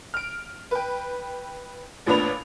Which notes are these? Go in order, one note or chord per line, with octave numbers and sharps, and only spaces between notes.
F6 D7
B4 G5
A1 A#2 B3 D4 B5 F7